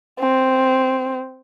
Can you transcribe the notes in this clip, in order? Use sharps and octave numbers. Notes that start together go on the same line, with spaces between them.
C4